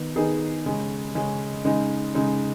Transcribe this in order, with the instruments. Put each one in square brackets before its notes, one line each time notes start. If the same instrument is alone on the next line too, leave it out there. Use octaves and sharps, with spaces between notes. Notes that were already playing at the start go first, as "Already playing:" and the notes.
Already playing: [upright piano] D#3 B3 D#4
D#3 B3 D#4 G#4
C#3 G#3 C#4
C#3 G#3 C#4
C#3 G#3 D#4
C#3 G#3 D#4